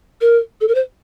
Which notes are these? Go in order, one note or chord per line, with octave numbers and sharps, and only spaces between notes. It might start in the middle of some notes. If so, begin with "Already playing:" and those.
A#4
A4
A#4
C5